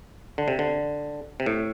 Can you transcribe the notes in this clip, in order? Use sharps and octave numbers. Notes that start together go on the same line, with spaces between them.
D3
C3
D3
C3
A2